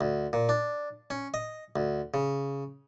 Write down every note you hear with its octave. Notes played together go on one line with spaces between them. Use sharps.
D2
A#2
D4
C#4
D#5
D2
C#3